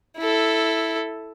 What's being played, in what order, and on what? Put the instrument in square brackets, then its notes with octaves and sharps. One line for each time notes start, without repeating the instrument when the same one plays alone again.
[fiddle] E4 A4